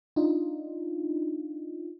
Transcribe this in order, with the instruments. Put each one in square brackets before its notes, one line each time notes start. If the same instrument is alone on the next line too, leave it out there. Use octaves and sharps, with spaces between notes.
[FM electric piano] D4 D#4 F4